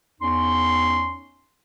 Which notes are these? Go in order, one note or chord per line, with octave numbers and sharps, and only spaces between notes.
E2 C#4 D#4 C6